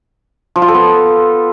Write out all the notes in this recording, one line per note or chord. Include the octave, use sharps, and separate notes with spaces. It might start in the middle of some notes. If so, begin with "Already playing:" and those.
F3
F4
A4
B3